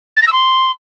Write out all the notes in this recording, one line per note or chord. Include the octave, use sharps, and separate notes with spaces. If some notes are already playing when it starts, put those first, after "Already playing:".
A6
A#6
E6
C6